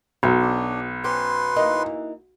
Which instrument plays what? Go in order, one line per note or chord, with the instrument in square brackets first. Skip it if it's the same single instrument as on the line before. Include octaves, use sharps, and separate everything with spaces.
[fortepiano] B1 [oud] F#3
[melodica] D4
[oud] C#4 G4 [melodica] B4 C6
[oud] E3 A#3 D#4